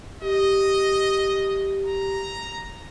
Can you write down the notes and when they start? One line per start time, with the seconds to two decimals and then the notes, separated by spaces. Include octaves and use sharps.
0.22 G4 D#5
1.86 A#5